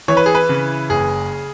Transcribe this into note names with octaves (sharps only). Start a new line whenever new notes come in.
E3 C#5
B4
G#4
B4
C#3
F#1 G#4